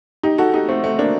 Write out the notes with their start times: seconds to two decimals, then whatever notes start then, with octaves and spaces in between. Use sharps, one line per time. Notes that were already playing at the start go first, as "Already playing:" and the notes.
0.23 D#4 G4
0.38 F#4 A4
0.53 D#4 G4
0.68 A3 C4
0.84 A3 C4
0.99 A#3 D4